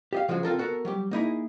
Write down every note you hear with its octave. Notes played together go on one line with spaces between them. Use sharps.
G4 D#5 F5
C#3 F3 F#3 G#3 F#4 G#4
C4 F4 A4 A#4
B3 F#4 A4 A#4
F#3 G3 G4
A#3 D#4 E4 G#4